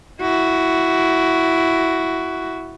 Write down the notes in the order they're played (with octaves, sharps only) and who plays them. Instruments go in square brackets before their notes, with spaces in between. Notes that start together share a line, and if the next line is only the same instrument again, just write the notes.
[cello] E4 F#4